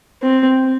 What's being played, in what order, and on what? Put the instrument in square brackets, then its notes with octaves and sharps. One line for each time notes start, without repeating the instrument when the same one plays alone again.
[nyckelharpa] C4